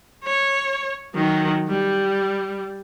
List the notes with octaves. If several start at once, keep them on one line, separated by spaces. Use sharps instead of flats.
C#5
D#3 F#3
G3